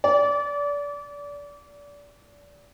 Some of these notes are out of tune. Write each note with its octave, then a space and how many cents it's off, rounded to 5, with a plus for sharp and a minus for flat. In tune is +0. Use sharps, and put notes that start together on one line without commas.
D5 -25